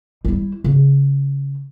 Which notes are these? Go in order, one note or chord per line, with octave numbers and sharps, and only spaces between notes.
G3 E4
C#3